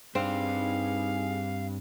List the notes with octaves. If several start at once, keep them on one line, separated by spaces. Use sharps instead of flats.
G2 C4 D4 D#4 G#4 F5